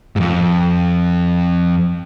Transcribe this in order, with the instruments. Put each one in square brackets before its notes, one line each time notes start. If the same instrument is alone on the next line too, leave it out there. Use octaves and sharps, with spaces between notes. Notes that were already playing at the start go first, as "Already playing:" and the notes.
[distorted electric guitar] F2 G#2